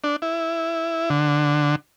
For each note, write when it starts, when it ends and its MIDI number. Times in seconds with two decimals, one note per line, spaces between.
0.04 0.16 62
0.22 1.09 64
1.10 1.76 50